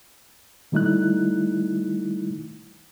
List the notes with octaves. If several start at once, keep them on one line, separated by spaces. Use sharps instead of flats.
D#3 G3 A3 D#4 E4 F#6